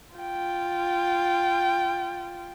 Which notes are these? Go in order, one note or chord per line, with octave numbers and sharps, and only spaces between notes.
F4 G5